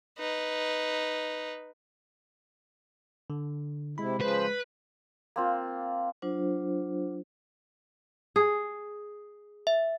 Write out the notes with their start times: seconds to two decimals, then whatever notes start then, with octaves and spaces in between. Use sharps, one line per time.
0.19 D#4 B4
3.30 D3
3.98 C3 G#3 E4 B5
4.21 C#3 F3 B4 C5
5.36 A#3 C4 F4
6.22 F#3 D4 F4 C5
8.36 G#4
9.67 E5